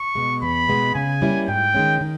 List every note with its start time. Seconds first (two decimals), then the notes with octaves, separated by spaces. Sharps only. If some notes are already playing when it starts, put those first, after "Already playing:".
Already playing: C#6
0.15 B2 G#3
0.42 E2 B5
0.68 B2 G#3 B3
0.95 C#3 G#5
1.22 G3 A#3 C#4 E4
1.48 G#2 G5
1.75 D#3 G#3 C#4
2.01 D#3